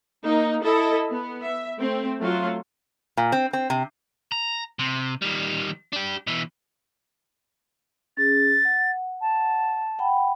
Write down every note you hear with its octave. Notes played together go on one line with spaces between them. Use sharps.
A#3 D#4
E4 A4 D#5
B3
E5
A3 C4
F#3 A3 F4
A#2
C4
C4
C3
A#5
C3
D#3 G3
D4 G4
B2 E3
C#4 G#4 A6
F#5
A5
F#5 G5 B5